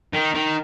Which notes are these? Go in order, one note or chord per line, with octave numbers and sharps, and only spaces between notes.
D#3
D#3